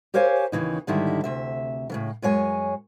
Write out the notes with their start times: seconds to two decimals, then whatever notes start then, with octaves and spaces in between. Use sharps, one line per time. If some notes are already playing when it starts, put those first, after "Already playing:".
0.14 G4 A#4 C5 C#5 F5 G#5
0.52 D#2 C#3 E3 D#4
0.87 G#2 D3 D#3 G3 E4
1.24 D2 C3 E5
1.90 A2 C#3 E3
2.22 F#2 G#3 C#5 G#5